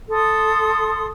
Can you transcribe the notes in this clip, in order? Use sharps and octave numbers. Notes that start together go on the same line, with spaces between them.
A4 C6 D#6